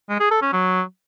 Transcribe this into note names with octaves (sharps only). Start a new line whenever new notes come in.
G#3
G#4
A4
C#4
F#3